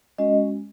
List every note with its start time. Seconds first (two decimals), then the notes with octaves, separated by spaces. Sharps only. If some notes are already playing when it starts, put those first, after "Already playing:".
0.18 G#3 C#4 F#4 D#5